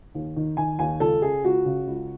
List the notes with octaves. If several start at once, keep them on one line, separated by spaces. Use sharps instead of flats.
D#2
D#3
D#3 G#5
D#2 G#5
C#2 A4
C#3 G#4
C#2 F#4
C#3
C#2